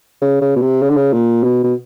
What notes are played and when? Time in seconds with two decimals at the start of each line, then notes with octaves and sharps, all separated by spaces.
0.21 C#3
0.41 C#3
0.56 B2
0.61 C3
0.82 C#3
0.90 D3
0.96 C#3
1.13 A#2
1.43 B2
1.63 B2